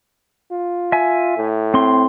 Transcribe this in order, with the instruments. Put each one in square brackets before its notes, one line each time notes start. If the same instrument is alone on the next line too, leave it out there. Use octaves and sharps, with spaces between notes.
[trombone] F4
[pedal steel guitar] E5 G#5
[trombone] A2
[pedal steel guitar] C4 C6